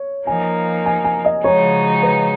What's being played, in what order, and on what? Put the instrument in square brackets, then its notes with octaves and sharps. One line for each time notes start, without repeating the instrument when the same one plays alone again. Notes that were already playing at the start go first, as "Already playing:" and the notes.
Already playing: [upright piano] C#5
[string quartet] F3 A#3 D#4 [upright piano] G#5
[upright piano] G#5
G#5
D#5
[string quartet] C#3 F3 G#3 D#4 F#4 [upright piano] C#5
[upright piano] B4